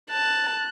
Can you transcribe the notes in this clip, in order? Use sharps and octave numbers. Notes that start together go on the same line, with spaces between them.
A5 F#6